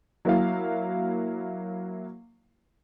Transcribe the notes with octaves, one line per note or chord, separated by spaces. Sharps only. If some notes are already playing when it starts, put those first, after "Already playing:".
F#3 A#3 E4 F5